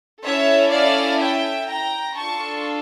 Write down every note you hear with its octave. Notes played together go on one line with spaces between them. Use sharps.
C#4 E4 A4 C#5 E5
D5 F5
E5 G5
G5 A#5
D4 F4 A4 A5 C#6